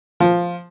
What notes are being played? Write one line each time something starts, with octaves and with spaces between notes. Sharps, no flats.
F3